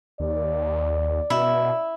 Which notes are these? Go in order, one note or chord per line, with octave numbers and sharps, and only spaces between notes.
D#2 D5
B2 E4